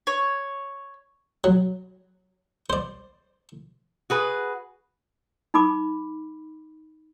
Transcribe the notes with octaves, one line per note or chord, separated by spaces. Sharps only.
C#5
F#3
C5 D5
F#4 G#4 B4
D#4 B5 D6